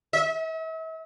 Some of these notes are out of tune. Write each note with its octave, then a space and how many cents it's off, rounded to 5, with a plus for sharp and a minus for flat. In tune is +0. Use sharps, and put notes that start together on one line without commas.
E5 -40